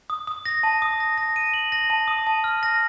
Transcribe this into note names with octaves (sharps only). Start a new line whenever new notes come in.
D#6
D#6
A#6
A5
D#6
A#6
A#6
D#7
F#7
A#6
A5
D#6
A5
F6
A#6